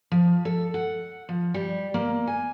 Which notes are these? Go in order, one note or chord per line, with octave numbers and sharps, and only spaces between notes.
F3
A4
F#5
F3
G3
A#3
G#5